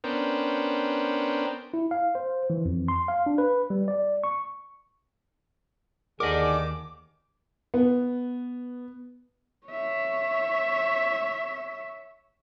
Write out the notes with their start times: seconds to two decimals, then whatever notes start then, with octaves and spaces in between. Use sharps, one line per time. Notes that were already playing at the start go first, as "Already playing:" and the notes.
0.04 B3 C#4 D4 A#4 C5 G5
1.74 E4
1.91 F5
2.15 C5
2.50 E3
2.65 F2
2.88 C6
3.08 F5
3.26 D4
3.38 B4
3.70 G3
3.88 D5
4.24 C#6
6.20 D#2 D3 G#4 A#4 D#5 D6
7.74 B3
9.67 C#5 E5